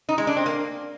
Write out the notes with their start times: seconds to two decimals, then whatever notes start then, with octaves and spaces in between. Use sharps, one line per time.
0.09 D#4
0.18 G#3
0.27 D4
0.37 C4
0.46 A#3